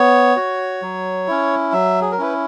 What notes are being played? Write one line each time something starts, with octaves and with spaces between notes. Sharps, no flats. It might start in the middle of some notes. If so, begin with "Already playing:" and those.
Already playing: B3 C#5
F#4
F#3
C#4 E4
F#3 E5
G#4
A#4
C#4 E4 B4